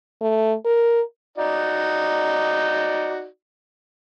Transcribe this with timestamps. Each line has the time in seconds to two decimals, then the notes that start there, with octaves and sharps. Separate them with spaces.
0.21 A3
0.65 A#4
1.38 D#4 F#4 D5